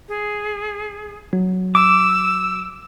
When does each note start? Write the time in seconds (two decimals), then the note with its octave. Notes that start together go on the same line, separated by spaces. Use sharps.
0.09 G#4
1.33 F#3
1.75 D6 E6